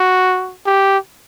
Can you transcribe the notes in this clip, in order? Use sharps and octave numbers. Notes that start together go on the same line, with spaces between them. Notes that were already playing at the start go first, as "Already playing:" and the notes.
Already playing: F#4
G4